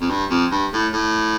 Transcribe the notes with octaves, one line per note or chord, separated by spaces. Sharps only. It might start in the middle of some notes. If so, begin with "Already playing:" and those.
F2
G2
F2
G2
A2
A2